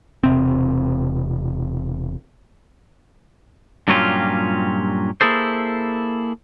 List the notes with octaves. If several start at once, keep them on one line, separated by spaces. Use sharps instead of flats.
E1 C3 C4
G2 A#2 F#3 C#4 F4 G4
A#3 E4 G#4 A4 C5